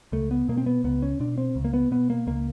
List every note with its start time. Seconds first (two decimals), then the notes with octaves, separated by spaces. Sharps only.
0.12 C#2 A3
0.31 B3
0.48 B2 A#3
0.57 C4
0.66 B3
0.84 C#2 B3
1.02 C#4
1.20 B2 D4
1.38 C4
1.56 C#2
1.64 A#3
1.73 B3
1.91 B2 B3
2.10 A#3
2.27 C#2 A#3